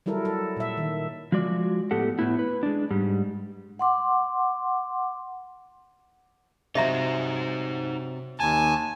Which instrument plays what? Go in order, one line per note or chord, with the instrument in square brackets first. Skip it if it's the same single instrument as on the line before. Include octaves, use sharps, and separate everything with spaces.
[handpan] F#3 G3 E4 A4 A#4
A4
A#2 E5
D#3
[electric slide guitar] F3 G#3 F#4 D5
A2 B3 G4 A4 F#5
A2 B3 E4
B4
G#3 D4
G#2 G3
[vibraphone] F#5 C6 D6
[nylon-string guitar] C3 F#3 [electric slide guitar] D#4 C5 [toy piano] D#5 E5 A#5
[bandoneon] D#2 G#5 [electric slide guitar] A5